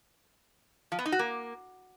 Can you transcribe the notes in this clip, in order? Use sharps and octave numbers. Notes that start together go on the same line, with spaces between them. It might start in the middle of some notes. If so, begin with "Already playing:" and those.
F3
B3
D#4
F#4
A#3